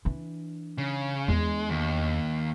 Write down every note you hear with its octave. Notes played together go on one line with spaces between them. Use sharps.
E3 D4
C#3
E2 G#3 D4
D#2